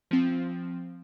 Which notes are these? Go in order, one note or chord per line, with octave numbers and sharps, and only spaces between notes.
F3 C4